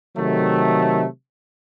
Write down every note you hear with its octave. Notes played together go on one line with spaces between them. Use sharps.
C3 D#3 F#3 A3